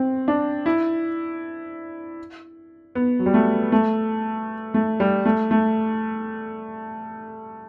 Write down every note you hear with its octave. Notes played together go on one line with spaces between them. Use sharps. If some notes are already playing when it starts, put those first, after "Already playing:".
Already playing: C4
D4
E4
B3
F#3
G3
A3
A3
A3
G3
A3
A3